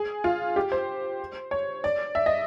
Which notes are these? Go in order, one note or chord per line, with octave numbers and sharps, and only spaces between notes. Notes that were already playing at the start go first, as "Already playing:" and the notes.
Already playing: G#4
F4
G4
C5
C#5
D5
E5
D#5